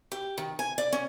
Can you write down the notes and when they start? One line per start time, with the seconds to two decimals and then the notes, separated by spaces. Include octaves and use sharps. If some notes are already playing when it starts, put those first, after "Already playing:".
0.12 G4
0.38 D#3
0.59 G#5
0.78 D5
0.93 C#4